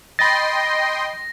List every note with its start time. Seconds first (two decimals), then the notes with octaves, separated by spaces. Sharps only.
0.19 D#5 G5 B5 C6 A6 A#6